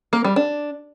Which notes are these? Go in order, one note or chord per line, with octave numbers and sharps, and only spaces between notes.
A#3
G3
D4